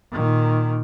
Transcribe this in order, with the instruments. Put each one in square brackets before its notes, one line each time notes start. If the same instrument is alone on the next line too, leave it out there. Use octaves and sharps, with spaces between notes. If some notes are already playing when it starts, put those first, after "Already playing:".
[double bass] A#2 D#3